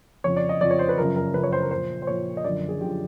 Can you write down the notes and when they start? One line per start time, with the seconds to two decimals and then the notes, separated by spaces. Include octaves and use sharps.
0.24 F2 C#3 F3 C#5
0.36 D5
0.49 D#5
0.61 F2 C#3 F3 D5
0.71 C#5
0.79 C5
0.89 B4
0.98 F#2 C#3 F3 A#4
1.16 A#4
1.34 F#2 C#3 F3 B4
1.43 C#5
1.53 C5
1.62 A#4
1.71 A#2 F3 C5
2.02 C5
2.07 A#2 F3 C#5
2.37 D#5
2.44 F#2 D3 F3 D5
2.69 G#4
2.81 F#2 D3 F3 G4